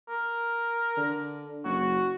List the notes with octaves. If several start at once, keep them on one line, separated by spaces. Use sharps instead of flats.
A#4
D3
F#1 F#4